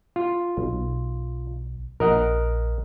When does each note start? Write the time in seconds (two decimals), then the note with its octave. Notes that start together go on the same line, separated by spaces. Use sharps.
0.16 F4
0.57 B1
2.00 A#1 A#4 D#5 F#5